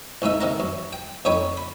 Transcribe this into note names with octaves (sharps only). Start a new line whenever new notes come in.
C2 G#2 D#4 E5
C3 D#3 F#5 A#5
F#2
G5
F2 D#4 C#5 G5 B5
B5